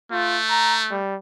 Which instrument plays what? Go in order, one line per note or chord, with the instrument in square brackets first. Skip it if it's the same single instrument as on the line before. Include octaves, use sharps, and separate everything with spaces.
[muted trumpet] A3 [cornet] F4
[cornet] A#5
G3